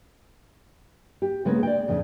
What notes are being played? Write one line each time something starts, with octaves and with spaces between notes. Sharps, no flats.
G4
C#3 G#3 A#3 B3 G#4
D5 G5
F2 A2 C#3